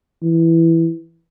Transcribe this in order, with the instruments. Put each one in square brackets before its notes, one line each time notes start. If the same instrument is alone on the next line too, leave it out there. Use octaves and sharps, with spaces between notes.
[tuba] E3